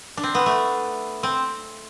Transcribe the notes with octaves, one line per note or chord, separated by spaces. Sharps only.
D4
C4
B3
A3
C4